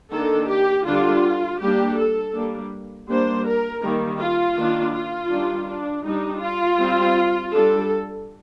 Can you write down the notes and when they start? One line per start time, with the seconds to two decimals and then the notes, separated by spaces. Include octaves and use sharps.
0.13 D#3 A#3 D4 A4
0.50 G4
0.87 D3 G3 D4 F4
1.61 G3 A#3 D4 G4
1.98 A4
2.35 G3 A#3 D4
3.09 G3 A#3 D4 C5
3.46 A#4
3.83 D#3 G3 A#3
4.20 F4
4.58 D#3 A#3 D4
4.94 F4
5.31 D#3 G3 D4
5.68 D4
6.06 G3 D4 D#4
6.42 F4
6.80 G3 C4
7.53 G3 D4 A4